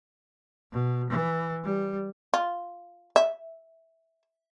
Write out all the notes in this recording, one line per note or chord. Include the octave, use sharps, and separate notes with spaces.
B2
E3
G3
F4
E5